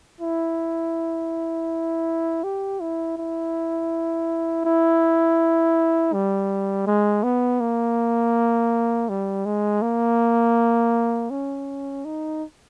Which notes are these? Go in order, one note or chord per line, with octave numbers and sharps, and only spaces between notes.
E4
G4
E4
E4
E4
G3
G#3
B3
A#3
G3
G#3
A#3
C#4
D#4